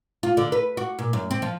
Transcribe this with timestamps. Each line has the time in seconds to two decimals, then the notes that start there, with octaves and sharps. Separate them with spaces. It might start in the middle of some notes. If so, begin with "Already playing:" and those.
0.23 F4
0.37 D3
0.52 B4
0.77 F#4
0.99 A#2
1.13 F#2
1.31 C4
1.42 F3